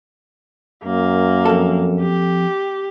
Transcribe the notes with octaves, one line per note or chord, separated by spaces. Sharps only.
F#2 A#3
F2 A4
G4